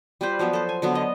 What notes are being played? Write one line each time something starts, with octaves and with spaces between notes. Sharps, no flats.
G3 F4 B4 C5
F3 F#3 B3 B4
A4 C5
G#5
D3 F#3 B3
D#5